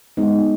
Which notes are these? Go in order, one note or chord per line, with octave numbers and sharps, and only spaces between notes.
G#3 B3 D#4